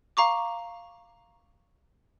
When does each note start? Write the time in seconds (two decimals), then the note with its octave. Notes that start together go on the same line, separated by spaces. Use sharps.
0.17 F5 A#5 C#6 D6